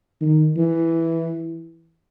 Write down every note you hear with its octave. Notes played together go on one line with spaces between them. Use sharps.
D#3
E3